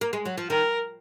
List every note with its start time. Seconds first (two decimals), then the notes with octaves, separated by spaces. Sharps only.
0.01 A#3
0.13 G#3
0.26 F#3
0.38 F3
0.50 D#3 A#4